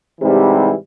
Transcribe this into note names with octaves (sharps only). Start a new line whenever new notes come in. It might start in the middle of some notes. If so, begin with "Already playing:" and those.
G#2 C3 E3 G3